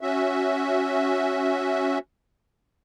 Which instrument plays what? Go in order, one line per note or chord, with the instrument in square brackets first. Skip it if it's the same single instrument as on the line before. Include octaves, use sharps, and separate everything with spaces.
[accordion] C#4 F#4 E5